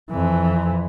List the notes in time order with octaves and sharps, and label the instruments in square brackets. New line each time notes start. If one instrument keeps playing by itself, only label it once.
[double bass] F2 E3